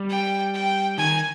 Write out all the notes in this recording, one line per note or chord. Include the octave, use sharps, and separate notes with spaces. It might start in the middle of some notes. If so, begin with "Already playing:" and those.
Already playing: G3
G5
G5
D#3 G#5